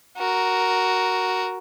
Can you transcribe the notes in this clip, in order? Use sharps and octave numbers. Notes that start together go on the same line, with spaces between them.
F#4 A#4